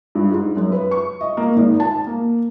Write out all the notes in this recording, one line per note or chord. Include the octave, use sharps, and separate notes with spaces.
G2
G#2
F#2
B4
C#6
D#5
A#3
G#1
A5
A#3